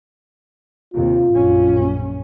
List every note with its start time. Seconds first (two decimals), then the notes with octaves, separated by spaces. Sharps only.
0.94 D#2 C3 F4
1.33 A#1 F#2 C#4